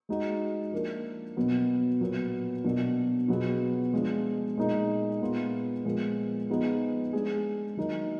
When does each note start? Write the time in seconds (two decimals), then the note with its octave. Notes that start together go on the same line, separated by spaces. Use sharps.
0.09 G#3 D#4 F#4
0.72 F3 A#3 D4
1.37 B2 F#3 B3
2.01 A#2 F#3 B3
2.64 B2 F#3 A#3 D4
3.28 B2 F#3 B3 F4 G#4
3.94 F3 G#3 D4 F4
4.57 A#2 G#3 D#4
5.21 A#2 G#3 B3 F4
5.85 A#2 F3 G#3 B3
6.50 F3 B3 D#4 G#4
7.13 G#3 D4 G#4
7.77 D#3 F#3 A#3 D#4